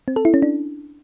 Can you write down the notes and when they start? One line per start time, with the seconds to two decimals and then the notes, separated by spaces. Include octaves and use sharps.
0.08 C4
0.16 A4
0.25 E4
0.34 C#4
0.42 D4